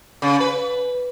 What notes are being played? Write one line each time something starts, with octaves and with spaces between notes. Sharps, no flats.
C#3
B4